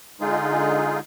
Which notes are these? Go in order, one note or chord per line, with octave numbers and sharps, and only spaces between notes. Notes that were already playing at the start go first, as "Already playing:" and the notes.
D3 G#3 D#4 F4 G#4